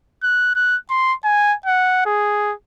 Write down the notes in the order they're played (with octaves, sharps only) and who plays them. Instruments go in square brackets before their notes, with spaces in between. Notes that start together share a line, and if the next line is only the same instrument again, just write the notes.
[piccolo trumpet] F#6
F#6
C6
G#5
F#5
G#4